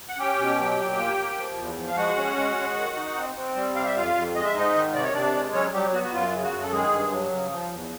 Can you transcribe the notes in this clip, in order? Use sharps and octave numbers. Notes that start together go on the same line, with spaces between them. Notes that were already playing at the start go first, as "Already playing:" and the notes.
F#5
C#4 G4 G5
B2
F#3
A#2
A#3
A#3
F3
E2
F3
F5
G#3 F#4 F#5
C#4
G#3
G#3
D#3
D#4
C4
C4
G3
C3 F5
E5
F2 F4 F5
F2
G#3 D#5
E5
G#2 D#4 D#5
D#3
C3 D5
C#5
C3 D4 D5
G#3
F#3 C#4 C#5
F#3 G3 G4
B3 F#4
F#4
F#2 F4
C#3
F#4
F#2
A4
D#3 G#3 G#4
G2
F#3
C#3
F3
E2